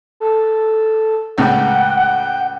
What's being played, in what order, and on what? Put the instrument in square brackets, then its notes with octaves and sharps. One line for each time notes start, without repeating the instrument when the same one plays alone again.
[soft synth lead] A4
[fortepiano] C#2 A2 C#3 [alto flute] F#5 [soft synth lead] G5